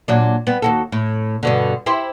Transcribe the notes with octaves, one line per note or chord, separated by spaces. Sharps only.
A#2 F#3 D4
G3 B3
D#2 F#4 A4
A2
G2 B2 D3
E4 G4 C5